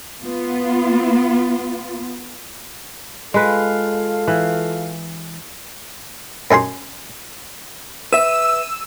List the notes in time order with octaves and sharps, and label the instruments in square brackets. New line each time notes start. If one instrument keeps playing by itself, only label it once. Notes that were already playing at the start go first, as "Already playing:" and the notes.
[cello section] B3 F4
[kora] G#3 B4 [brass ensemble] F4 A4 F5
[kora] E3
[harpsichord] F#2 D#4 G#4 C6
[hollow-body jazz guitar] B4 E5 [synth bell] E6 D#7 E7